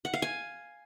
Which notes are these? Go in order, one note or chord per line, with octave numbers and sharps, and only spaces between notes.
F#5
F5
G#5